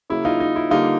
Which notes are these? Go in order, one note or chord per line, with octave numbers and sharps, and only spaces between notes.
C#3 F#3 A#3 E4
D#4 F4
D#4
E4
D3 G3 A#3 D#4 F4